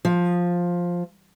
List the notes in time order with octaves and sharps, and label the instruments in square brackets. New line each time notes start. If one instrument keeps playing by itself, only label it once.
[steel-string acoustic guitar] F3